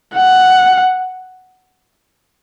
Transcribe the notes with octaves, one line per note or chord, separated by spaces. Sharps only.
F#5